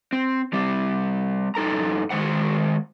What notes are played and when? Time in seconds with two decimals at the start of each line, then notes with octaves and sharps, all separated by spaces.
0.13 C4
0.53 G3 C4
1.55 G2 D#4 A4 A#5
2.10 D#3 G#3 C5 F#5